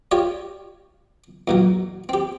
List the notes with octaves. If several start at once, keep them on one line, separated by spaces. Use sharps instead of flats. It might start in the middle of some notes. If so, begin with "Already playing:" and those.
F4 G4 C#5 D5
E2 A#2 F#3
C4 G4